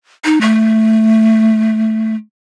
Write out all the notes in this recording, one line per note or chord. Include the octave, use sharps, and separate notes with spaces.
D#4
A3